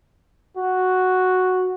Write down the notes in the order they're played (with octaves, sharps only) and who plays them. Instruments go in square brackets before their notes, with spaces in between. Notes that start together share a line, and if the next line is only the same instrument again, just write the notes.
[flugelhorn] F#4